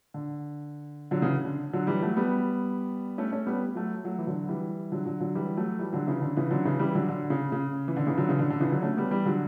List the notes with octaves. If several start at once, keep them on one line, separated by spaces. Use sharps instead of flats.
D3
D3 F#3
C#3 E3
D3
D3 F#3
E3 G3
F#3 A3
G3 B3
A3 C#4
A3 C#4
G3 B3
F#3 A3
F#3 A3
E3
D3 F#3
E3 G3
D3 F#3
D3 F#3
D3 F#3
E3 G3
F#3 A3
E3 G3
D3 F#3
C#3 E3
D3
C#3 E3
D3 F#3
C#3 E3
E3 G3
D3 F#3
D3
C#3
C#3
E3
D3
C#3 E3
D3 F#3
C#3 E3
D3
D3
C#3 E3
D3 F#3
A3 C#4
G3 B3
E3 G3
D3 F#3